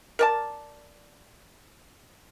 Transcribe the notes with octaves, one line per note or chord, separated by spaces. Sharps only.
A#4 D5 A5